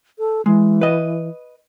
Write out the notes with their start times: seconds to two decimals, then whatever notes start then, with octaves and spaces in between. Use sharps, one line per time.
0.19 A4
0.46 E3 G#3
0.81 B4 D#5